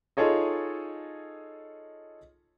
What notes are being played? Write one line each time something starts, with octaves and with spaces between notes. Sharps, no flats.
D#4 F4 G#4 A4 C#5 D#5